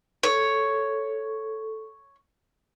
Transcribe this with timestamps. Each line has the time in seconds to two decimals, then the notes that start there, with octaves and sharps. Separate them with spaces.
0.23 A4 C#5